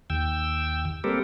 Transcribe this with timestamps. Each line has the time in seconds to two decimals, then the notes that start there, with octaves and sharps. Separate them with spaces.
0.10 D#2 G5 E6
1.04 G3 A#3 C4 G4 A4 A#4